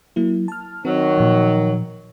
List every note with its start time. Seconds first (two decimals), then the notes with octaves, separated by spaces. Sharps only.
0.16 F#3 A#3 E4
0.48 A5 F6
0.85 D#3 F#3 C4
1.18 A#2 F3